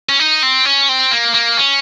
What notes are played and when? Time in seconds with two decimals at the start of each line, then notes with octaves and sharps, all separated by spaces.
0.09 C#4
0.19 D#4
0.43 C4
0.65 C#4
0.89 C4
1.11 A#3
1.34 A#3
1.57 C#4